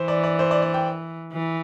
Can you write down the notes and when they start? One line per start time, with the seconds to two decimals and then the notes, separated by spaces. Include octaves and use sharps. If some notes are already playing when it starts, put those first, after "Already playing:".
Already playing: E3 C5
0.08 D5
0.24 D5
0.39 C5
0.51 D5
0.62 D5
0.74 G5
1.33 E3